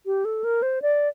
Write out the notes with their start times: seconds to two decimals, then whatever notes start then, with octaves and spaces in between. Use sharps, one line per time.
0.06 G4
0.25 A4
0.44 A#4
0.62 C5
0.82 D5